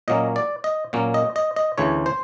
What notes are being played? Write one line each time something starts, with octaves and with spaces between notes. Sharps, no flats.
A#2 F#3 A#3 C#4 D#5
D5
D#5
A#2 F#3 A#3 C#4
D#5
D#5
D#5
D2 C#3 E3 C#5
C5